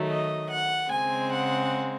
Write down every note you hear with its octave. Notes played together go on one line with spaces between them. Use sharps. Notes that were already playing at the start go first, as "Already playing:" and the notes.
Already playing: D#3 F#3 A3
D#5
F#5
C#3 G#3 C4 G#5
F#5